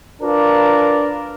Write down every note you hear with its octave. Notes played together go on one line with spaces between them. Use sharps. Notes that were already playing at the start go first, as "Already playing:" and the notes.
D4 F4 A#4 B4